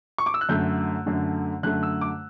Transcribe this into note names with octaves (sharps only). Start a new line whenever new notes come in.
C#6
D6
E6
F#6
F#2 D3 A3 G6
F#2 D3 A3
F#2 D3 A3 F#6
E6
D6